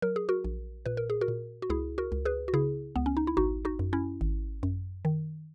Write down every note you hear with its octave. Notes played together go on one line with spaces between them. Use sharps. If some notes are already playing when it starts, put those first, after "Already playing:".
F#3 A#4
G#4
F#4 A#4
A#1
A#2 B4
A#4
G#4
F#4 A#4
A#2
F#4
C#2 E4 G#4
F#4 A#4
C#2
G#4 B4
F#4
C#3 E4 G#4
C#2 B3
C#4
D#4
E4
G#1 D#4 F#4
D#4 F#4
F#2
C#4 E4
G#1
F#2
D#3